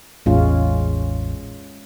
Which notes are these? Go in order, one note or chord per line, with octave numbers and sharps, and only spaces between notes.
A1 E2 G#3 C#4 F4